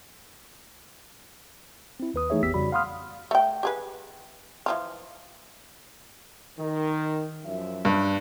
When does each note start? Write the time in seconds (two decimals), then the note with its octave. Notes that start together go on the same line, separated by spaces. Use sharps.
2.00 C4 E4
2.14 D#2 B4 D#6
2.30 E3 A3 D#4 G#4 C#5 E5
2.43 G#1 E2 B3 G4 E6 B6
2.54 F2 C#3 G3 F#4 D5 B5
2.72 F5 F#5 B5 C6 D#6 F6
3.31 A3 G5
3.63 G4 G#4 B4
4.66 E3 F3 F4
6.59 D#3
7.45 F#2 F3 E5
7.85 G2